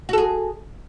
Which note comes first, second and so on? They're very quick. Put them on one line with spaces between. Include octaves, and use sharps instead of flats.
F#4 A4 G#4